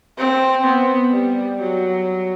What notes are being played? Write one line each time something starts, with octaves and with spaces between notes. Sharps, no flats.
C4
B3
G3
F#3